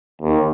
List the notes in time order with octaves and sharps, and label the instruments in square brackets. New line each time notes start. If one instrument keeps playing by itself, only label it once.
[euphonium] D#2